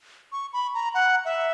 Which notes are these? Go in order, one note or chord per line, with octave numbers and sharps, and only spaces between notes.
C#6
B5
A#5
F#5
E5